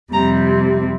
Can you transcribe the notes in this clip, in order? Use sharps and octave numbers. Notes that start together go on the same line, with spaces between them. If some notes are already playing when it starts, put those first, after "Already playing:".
F2 C3 G3 C4 A#5